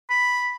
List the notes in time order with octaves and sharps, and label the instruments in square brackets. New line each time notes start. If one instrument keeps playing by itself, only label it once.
[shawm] B5